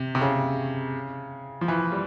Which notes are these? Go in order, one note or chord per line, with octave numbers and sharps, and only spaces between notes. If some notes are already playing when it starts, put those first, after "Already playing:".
Already playing: C3
C3
C#3
F3
E3
G3